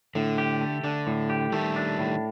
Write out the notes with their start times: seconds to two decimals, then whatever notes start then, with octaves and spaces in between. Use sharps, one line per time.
0.15 A2 D3
0.38 G4
0.61 A3
0.84 D3 D4
1.07 A2
1.30 G4
1.52 D#3 G3 A3
1.76 D4
1.99 A2